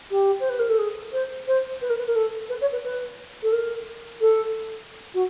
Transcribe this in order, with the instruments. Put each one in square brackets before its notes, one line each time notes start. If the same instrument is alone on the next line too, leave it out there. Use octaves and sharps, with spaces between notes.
[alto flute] G4
C5
B4
A#4
A4
G#4
C5
C5
B4
A#4
B4
A#4
A4
B4
C#5
B4
B4
A4
A#4
A4
F#4